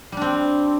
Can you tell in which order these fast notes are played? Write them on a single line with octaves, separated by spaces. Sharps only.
G3 D4 C4